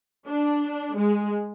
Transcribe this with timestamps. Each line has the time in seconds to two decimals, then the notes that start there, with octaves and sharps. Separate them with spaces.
0.27 D4
0.96 G#3